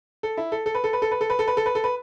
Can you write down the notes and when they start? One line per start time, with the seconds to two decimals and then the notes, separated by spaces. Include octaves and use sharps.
0.23 A4
0.37 E4
0.52 A4
0.66 A4
0.75 B4
0.84 A4
0.93 B4
1.02 A4
1.11 B4
1.21 A4
1.30 B4
1.39 A4
1.48 B4
1.57 A4
1.66 B4
1.75 A4
1.84 B4